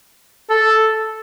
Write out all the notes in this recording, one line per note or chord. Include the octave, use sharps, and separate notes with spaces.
A4